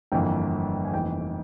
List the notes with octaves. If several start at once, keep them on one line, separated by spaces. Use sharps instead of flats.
G1 F2 E3 A#3 G5
G#5
F1 F2 E3 A#3 G5